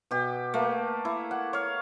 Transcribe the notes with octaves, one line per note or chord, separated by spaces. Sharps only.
B2 G4
A3 A#3
E4
F#5
C#5 F5